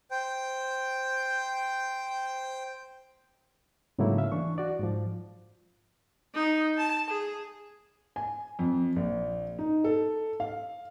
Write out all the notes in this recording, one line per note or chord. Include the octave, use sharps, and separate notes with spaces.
C5 G5
G#2 C#3 F#3 A3 A#3 E4
E5 F5
E3 D4 C#6
F#4 D5
G#2 F3
D#4
A5
G#4
G#5
F2
A#1
D#4
A4
F5